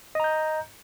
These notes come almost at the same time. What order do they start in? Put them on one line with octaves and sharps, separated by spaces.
D#5 A#5 G6